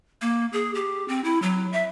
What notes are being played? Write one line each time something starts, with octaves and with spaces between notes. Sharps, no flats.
A#3
G#4
G4
C4
E4
F#3
E5